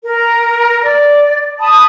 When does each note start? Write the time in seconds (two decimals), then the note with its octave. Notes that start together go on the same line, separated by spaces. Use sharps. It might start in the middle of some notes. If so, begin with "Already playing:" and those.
0.03 A#4
0.83 D5
1.59 A5 B5 D#6